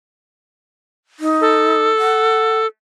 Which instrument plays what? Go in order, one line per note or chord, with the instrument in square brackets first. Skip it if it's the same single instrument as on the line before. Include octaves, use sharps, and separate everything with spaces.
[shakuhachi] D#4
[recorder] A4
[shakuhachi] F#5